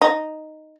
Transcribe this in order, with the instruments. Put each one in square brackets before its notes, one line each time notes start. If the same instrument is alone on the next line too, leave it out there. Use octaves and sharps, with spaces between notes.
[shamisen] D#4